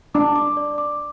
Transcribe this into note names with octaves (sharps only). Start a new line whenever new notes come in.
D4 D6
D6
D5
D6